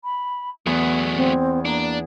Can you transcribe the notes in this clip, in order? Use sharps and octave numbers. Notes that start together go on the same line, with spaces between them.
B5
E2 F#3 A3 B3
C4
A#3 D4